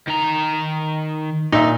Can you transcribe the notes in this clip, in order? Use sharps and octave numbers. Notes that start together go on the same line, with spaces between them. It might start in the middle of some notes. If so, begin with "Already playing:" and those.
D#3 A#5
A#2 D#4 E5